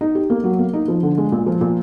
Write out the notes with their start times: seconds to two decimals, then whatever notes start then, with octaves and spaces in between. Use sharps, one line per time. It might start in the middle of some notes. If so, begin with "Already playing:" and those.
0.01 D#4
0.15 G4
0.30 A#3
0.44 F#3
0.59 A#3
0.73 D#4
0.88 F3
1.03 D3
1.18 G#3
1.32 A#2
1.46 F3
1.61 A#2